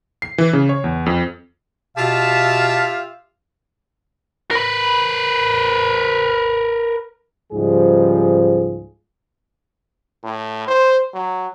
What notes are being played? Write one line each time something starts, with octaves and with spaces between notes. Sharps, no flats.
C7
E3
C#3
C#5
E2
F2
B2 F4 G4 E5 F5 A5
A#4 B4
C#2 G#2 F3 G3 G#4
A2
C5
F#3